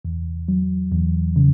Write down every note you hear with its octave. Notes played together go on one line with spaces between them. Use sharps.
E2
F#3
E2
C#3